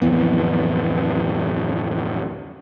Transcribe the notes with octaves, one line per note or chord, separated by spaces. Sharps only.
D1 F2 E3 B3